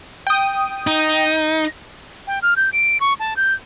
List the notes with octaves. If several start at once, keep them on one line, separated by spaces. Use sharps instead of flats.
G5 D#6
D#4
G5
F6
G6
D7
C#6
A5
G6